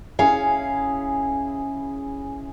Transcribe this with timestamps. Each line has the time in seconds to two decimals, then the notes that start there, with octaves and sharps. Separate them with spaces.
0.19 C#4 E4 G#4 F5